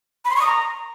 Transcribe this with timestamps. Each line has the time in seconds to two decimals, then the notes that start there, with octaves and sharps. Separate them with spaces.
0.25 B5
0.30 C6
0.36 C#6
0.41 D#6
0.47 A#5